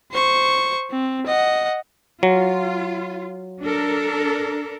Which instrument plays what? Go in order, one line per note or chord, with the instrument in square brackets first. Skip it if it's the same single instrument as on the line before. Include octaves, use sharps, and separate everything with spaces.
[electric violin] C5 C#6
C4
D#5 F#5
[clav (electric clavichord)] F#3 [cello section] F4
[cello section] D4 A4 A#4